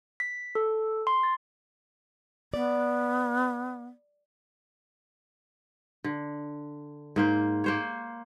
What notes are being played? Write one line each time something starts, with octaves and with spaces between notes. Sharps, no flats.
B6
A4
C6
A6
B3 D5
D3
G#2 A#3 C5
A#3 C5 C#5